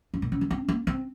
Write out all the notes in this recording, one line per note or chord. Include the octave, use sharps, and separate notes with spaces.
G2
A#2
C#3
D#3
C4
A#3
C4